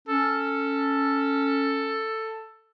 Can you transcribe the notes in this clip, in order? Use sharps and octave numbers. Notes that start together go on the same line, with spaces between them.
C#4 A4